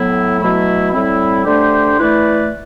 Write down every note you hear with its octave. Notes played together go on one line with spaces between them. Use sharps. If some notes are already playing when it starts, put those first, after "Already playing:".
Already playing: A2 F#3 B3 E4
B2 F#3 A3 E4
A2 G3 C4 E4
D3 A3 D4 G4 C5
E3 A3 E4 B4 D5